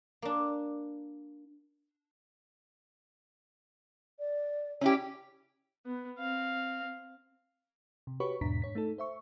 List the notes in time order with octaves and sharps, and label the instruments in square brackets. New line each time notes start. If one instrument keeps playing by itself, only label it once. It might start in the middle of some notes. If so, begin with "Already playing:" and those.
[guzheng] A#3 D4
[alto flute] D5
[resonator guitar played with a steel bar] C#4 E4 G4
[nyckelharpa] B3
C4 F5
[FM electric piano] C3
F#4 G4 B4 C#5 B5 C#6
E2 G#2 B2 D4 A#5 B6
G#2 C#5 B6
A3 D#4 A4
C5 E5 C#6